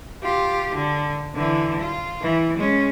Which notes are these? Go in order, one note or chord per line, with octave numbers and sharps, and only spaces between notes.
F4 G4
D3
D3 E3
F4
E3
G#3 C#4